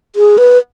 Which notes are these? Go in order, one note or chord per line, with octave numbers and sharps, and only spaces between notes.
G#4
B4